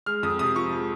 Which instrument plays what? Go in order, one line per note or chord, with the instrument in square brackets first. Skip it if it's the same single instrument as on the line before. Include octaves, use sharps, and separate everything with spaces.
[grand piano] G#3 F6
F2 D#6
C3 D#6
F3 C#6
G#3